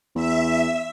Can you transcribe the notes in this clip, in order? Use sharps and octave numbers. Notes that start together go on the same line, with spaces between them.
E2 E5